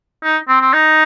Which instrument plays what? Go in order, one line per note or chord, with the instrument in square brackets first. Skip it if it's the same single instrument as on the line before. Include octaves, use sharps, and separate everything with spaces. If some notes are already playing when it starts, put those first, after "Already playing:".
[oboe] D#4
C4
C4
D#4